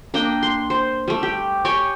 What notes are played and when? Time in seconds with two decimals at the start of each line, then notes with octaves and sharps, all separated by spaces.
0.14 A#3 D4 D#5 G5
0.43 C6
0.70 C5
1.08 G3 A3
1.23 G4
1.65 G4 C#5 G5 G#5